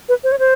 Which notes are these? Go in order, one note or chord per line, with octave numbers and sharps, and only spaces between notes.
B4
C5
C#5
C5